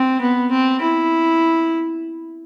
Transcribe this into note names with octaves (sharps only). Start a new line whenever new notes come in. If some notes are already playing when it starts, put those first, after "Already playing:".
Already playing: C4
B3
C4
E4